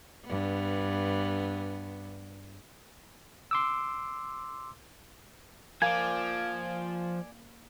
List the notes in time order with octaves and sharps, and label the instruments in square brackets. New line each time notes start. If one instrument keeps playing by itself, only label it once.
[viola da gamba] G2 B3
[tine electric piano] C6 D6 E6
[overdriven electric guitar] F3 [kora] A#3 [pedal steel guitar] D5 G#5